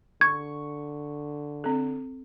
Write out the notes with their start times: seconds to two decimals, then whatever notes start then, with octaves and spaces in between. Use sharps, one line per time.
0.21 D3 C#6 G#6
1.64 C4 A4